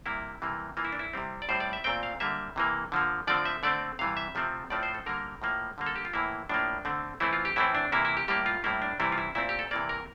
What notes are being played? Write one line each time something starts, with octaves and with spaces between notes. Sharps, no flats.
C3 G3 A#3 E4
C3 E3 G3 A#3
E3 A#3 F4
E4
D4
E4
C3 G3 C4
D5
A2 G3 C4 C5
D5
E5
A#2 A3 C4 G5
F5
D3 G3 A#3 E5
C3 E3 A#3
D3 F3 A#3
D3 F3 A3 C4 D5
E5
D3 A3 C4 D5
C3 E3 G3 F5
E5
C3 F3 A3 C4
A2 F3 A3 C4 D5
C5
A4
D3 G3 A#3 A#4
A2 F3 A#3
D3 G3 A#3
A4
G4
F4
A2 E3 A#3 E4
A2 F3 A#3 D4
D3 A3 C4
E3 A3 C4 E4
F4
G4
A2 E3 A3 C4 E4
D4
C3 E3 A#3 E4
E4
G4
A2 G3 A#3 G4
F4
A2 G3 A#3 E4
D4
C3 E3 G3 C4 E4
F4
E4
A#2 A3 C4 E4
G4
A4
C3 E3 A#3 D5
A#4